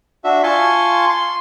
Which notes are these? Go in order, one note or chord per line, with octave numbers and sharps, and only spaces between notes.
D4 F#4 E5
F4 G#5 A5 C6 C#6
C6